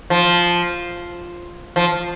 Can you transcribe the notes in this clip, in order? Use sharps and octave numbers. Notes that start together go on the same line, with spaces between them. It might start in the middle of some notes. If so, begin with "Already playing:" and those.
F3
F3